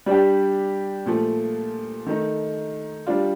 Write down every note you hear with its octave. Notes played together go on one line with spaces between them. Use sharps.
G3 D4 G4
A#2 F3 A3
D#3 A3 D#4
G3 D4 F4